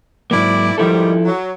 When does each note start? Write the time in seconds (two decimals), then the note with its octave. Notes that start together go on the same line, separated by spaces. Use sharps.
0.31 G#2 F#3 A#3 E4 D5
0.78 G#2 D#3 F3 G3 E4 A4
1.25 F#3